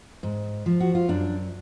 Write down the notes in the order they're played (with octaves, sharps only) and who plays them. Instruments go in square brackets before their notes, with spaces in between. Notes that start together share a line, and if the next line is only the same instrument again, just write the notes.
[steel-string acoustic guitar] G#2
F3
F#4
F4
F#2 D4